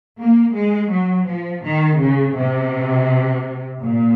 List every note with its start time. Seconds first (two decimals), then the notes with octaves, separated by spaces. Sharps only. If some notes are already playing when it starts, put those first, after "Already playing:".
0.20 A#3
0.55 G#3
0.91 F#3
1.27 F3
1.64 D#3
2.00 C#3
2.36 C3
3.80 A#2